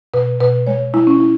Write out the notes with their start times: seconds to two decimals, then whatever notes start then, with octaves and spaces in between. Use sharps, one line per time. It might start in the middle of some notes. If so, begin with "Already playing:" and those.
0.14 B2 B4
0.40 B2 B4
0.67 G#3 C#5
0.94 G#3 E4
1.07 C#4
1.20 E4